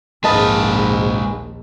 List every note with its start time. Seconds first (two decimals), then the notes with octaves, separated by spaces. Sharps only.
0.24 A#1 D#2 G#2 G#3 B4 D#5 A5